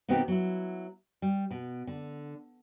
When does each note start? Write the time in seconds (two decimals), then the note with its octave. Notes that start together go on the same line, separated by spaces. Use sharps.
0.08 B2 D#3 B3 C4 D#4 G4
0.28 F#3 E4
1.22 G3
1.51 B2
1.87 D3